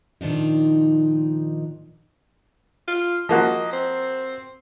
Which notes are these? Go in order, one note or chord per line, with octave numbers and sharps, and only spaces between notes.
A#2 D#3 F3 D4 D#4
F4
F3 A#3 F#4 D#5
C4